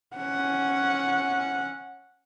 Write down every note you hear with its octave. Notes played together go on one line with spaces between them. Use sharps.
C#4 F#5